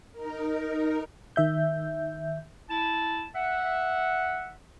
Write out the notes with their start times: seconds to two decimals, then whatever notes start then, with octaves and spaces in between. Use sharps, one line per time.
0.12 D#4 A#4
1.36 D#3 E5 G6
2.70 E4 A5
3.35 E5 F#5